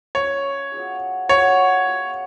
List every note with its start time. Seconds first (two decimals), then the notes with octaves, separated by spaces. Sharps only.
0.15 C#4 F4 B4 C#5
0.72 F#3 B3 F4 G#4
1.29 F#3 B3 F4 G#4 C#5
1.85 B3 F#4 B4